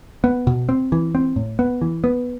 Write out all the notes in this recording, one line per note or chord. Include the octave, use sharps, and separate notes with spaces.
B3
B2
C4
E3
C4
A2
B3
E3
B3